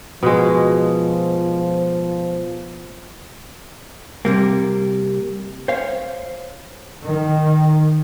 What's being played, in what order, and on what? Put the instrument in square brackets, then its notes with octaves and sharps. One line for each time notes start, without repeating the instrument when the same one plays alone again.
[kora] B2 G#3 [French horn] F3
[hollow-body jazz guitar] C3 G3 A#3
C5 C#5 F5
[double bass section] D#3